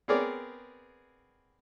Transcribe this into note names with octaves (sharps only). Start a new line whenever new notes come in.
B3 C4 G#4 A#4 C#5 D5